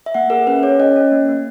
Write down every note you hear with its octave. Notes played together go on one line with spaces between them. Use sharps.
E5
A#3 F#5
G#4 A#4
C#4 B4
G#4 C#5
C#4 D#5
C#4
A#3
A#3